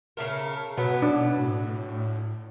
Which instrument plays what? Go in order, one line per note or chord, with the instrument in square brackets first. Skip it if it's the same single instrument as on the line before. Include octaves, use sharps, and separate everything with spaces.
[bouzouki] C#3 A3 A#4
[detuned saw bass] B2 [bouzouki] F#3 B3
[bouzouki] F#3 [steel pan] D4
[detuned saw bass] A2